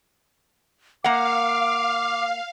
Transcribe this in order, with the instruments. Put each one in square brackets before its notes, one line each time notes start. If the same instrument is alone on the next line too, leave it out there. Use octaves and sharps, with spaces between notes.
[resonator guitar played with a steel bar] A#3 F#5 [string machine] F5 [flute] D6